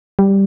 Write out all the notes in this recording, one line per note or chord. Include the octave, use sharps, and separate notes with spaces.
G3